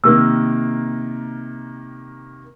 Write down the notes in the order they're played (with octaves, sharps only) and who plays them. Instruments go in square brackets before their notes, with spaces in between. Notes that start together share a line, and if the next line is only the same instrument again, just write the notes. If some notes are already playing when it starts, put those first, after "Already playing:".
[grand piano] C3 D#3 A#3 [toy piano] E6